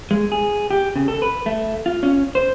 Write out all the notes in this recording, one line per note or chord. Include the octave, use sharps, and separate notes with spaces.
G#3
G#4
G4
C#3
A4
B4
A3
F4
C#4
C5